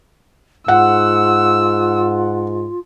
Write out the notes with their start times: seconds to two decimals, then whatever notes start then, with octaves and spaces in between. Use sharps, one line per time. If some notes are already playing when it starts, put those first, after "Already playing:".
0.68 G#2 F4 F#5 E6